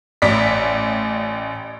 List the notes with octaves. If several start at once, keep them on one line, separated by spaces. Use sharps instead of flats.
A1 D5 B6